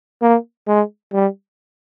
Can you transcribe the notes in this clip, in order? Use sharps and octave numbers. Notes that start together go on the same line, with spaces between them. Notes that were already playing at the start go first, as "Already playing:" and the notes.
A#3
G#3
G3